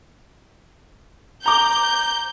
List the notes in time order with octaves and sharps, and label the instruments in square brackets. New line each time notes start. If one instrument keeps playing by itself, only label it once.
[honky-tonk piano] A#5 D6 [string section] G6